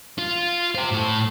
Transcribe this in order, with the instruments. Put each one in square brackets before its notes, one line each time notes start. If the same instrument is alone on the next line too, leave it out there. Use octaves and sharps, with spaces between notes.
[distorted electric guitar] F4
G4 C5
A2 A4